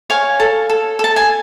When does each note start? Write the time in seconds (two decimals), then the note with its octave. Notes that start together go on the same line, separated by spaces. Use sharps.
0.10 C#5 F5 G#5
0.40 A4
0.70 A4
0.99 A4 A5
1.16 G#5